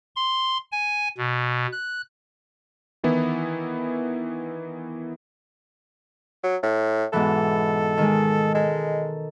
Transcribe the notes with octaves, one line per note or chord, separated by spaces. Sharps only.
C6
G#5
B2
F#6
D#3 E3 B3 E4
F#3
A2
G#2 B2 E3 A4
D#3 G#3
G#3 A4